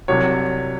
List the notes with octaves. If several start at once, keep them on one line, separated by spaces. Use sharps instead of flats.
C2 C3 F#3 C#5